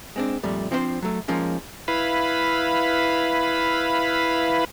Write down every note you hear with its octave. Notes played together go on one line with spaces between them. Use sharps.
G#3 C4 D4
F2 A#2 G3 A3
F3 C4 D4 E4 C5
F#3 A3
F3 G#3 A#3 C#4 D#4
E4 B4 F5 B5